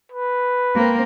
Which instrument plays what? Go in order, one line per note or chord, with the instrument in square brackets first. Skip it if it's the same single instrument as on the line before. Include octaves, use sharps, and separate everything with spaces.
[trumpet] B4
[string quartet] A#3 C4